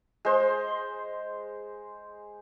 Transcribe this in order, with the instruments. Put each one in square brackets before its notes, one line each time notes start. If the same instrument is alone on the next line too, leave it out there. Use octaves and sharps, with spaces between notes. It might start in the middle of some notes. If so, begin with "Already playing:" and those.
[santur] G#3 C5